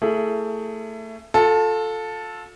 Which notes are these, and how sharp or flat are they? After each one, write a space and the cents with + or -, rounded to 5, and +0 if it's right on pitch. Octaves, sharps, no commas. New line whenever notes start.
A3 +25 E4 +10 G#4 +20
F4 +35 A4 +0